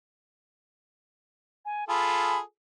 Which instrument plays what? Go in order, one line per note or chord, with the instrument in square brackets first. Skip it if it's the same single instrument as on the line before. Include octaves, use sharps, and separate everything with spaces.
[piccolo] G#5
[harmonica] F4 G#4 A4 [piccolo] B5